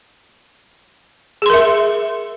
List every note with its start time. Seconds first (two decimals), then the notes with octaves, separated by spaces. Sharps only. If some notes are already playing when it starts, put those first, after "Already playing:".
1.42 G#4
1.46 C6
1.50 A#4
1.54 E5